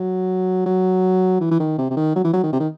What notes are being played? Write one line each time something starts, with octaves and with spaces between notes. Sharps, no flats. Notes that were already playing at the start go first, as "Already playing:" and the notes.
Already playing: F#3
F#3
E3
E3
D#3
C3
C3
D#3
F#3
E3
F#3
D#3
C3
D#3